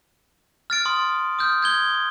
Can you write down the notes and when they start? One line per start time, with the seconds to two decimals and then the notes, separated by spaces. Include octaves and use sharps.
0.70 F6 A6 D7
0.85 C6 D#6
1.39 D#6 F6 G6
1.62 G6 G#6 G7